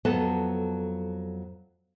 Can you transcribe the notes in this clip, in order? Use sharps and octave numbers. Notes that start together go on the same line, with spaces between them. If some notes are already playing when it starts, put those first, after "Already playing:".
F2 F#3 B3 A4 A5